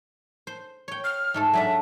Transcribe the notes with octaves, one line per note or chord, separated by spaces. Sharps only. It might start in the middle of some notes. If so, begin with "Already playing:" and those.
C5
C#5 G5
F6
G#2 A3 A4
F#3 D4 D5 E5